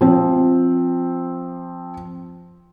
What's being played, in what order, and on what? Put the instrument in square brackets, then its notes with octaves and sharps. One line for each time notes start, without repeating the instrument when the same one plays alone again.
[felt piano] F3 C4